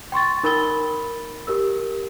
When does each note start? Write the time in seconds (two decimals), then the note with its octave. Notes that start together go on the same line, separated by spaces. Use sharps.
0.12 G5 C6 C#6 A6
0.43 D#4 A#4 B5 E6 A6 G7
1.47 G4 A#4 E6